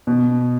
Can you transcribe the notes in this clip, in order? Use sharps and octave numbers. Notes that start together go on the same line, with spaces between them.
B2